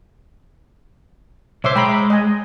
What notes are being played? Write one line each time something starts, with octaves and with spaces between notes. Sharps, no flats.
B1 C5 C#5 E5 D6
G#3 G5 A#5 B5
D#5 G#5